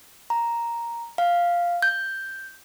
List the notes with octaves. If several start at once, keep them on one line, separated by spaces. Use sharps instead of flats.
A#5
F5
G6